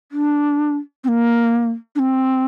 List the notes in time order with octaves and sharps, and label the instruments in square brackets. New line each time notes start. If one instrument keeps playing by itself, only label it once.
[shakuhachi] D4
C4
A#3
D4
C4